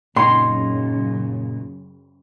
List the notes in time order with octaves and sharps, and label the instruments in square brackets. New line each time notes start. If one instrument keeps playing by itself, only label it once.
[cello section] F#2 C#3 [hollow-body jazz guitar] A#2 D#4 [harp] C6